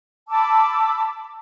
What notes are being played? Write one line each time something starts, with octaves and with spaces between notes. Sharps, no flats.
A5 B5 D6 E6